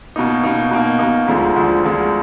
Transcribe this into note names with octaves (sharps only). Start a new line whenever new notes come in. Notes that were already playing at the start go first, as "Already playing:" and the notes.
B2 A#3 D#4
B2 A#3 D#4
B2 A#3 D#4
B2 A#3 D#4
D2 D3 F3 G#3
D2 D3 F3 G#3
D2 D3 F3 G#3